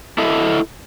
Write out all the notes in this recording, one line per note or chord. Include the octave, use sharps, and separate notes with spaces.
E4 A4 D#5 E5